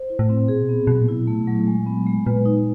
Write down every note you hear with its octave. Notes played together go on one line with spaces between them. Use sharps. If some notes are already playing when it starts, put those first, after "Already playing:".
Already playing: C5
E4
A2
C4
A#2 G#4
B2
B3
A#2
B2 F#3
A#2
E4
B2
A#2 A3
B2
A#2 F#3
G#3
B3
G#3
A#2 B4
D#4